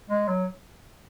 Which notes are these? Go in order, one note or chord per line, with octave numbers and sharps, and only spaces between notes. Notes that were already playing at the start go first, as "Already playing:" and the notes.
G#3
F#3